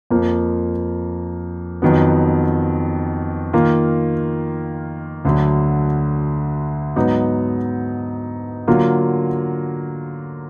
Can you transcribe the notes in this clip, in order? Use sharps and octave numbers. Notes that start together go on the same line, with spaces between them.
F2 F3 A#3
F2 D#3 F#3 B3
D#3 A#3 F4
D2 D3 F#3
G#2 F#3 B3 D#4
D3 F#3 A#3 F4